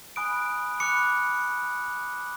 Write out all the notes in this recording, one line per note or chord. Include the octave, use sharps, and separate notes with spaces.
G#5 B5 D#6 F#6 D7
B5 D6 F#6 C#7